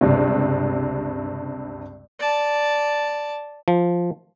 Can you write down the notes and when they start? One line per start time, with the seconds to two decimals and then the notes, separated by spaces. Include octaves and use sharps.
0.01 C#2 G2 C3
2.19 D5 A5
3.68 F3